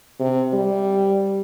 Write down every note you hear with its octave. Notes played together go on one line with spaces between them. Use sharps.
C3
G3